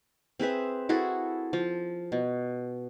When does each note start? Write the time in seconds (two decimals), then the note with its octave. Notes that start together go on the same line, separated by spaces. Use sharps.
0.40 C4 G#4 B4 E5
0.89 E4 F#4 G#4 A4
1.53 F3
2.12 B2